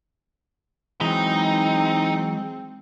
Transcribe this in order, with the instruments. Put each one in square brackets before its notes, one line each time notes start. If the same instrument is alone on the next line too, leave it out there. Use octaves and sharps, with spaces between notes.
[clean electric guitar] E3 F#3 [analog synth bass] G#3 [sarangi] C4 [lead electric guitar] D#4